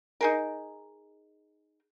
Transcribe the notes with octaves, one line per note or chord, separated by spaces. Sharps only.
D#4 G#4 A#4